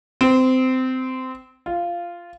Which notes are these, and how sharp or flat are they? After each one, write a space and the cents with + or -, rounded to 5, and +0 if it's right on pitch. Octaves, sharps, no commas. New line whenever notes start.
C4 -20
F4 -10